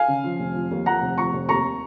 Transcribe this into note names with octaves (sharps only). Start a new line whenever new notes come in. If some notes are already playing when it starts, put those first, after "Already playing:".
Already playing: F5 G#5
C#3
F3
F1
F3
D#2
F3 F#5 A#5
F1
F3 A#5 C#6
F1
D#2 A#5 C#6